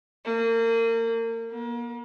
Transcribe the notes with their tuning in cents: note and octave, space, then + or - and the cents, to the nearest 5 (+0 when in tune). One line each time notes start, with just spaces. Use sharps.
A#3 -30
A#3 +40